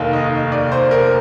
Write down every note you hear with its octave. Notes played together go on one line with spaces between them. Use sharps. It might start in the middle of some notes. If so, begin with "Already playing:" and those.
Already playing: F1 D#2 D#3 F5
D#5
D5
C5
A#4